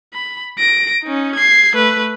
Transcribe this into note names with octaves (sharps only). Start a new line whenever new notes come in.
B5
A#6 D7
C#4 D#4
G#6 C7
A3 B4